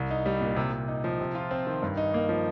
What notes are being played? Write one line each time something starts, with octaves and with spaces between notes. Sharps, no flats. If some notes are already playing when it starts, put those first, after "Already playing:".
Already playing: C2
D#4
G3
A#2
C3
C3
D#4
F3
C3
F4
C4
D#3
G2
D#4
A#3
F3